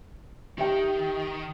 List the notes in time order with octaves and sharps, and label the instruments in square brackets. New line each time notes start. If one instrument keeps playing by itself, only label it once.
[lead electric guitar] D#3 [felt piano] G4 E5 G5